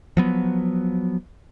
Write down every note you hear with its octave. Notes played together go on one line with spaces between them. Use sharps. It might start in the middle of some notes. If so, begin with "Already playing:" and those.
F3 F#3 B3